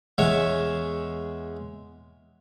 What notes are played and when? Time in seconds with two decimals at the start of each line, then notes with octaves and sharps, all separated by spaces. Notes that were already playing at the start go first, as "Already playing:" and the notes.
0.18 E2 G#3 C#5 E5